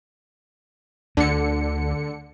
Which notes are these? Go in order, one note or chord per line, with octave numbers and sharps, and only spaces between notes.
D2 D3 C#7